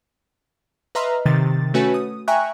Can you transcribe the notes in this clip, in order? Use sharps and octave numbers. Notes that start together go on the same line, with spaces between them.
B4 D#5 E5 A#5 C6 F6
C3 D#3 A6
A3 C#4 F#4 B4 C#5 G#5
D#6
E5 G5 G#5 A#5 C#6 F#6